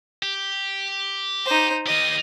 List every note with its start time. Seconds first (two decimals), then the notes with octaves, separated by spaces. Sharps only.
0.23 G4
1.46 D#4 C5
1.87 D#3 G4 D#5